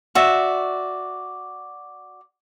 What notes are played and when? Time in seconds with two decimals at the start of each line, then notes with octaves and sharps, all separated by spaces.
0.15 F#4 D5 E5